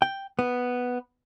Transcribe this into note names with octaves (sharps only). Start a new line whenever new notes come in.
G5
B3